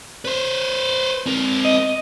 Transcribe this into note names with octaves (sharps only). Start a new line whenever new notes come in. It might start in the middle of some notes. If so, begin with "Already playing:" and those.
B4 C5
C4 A#4
D#5